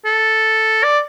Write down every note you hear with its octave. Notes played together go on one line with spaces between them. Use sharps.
A4
D5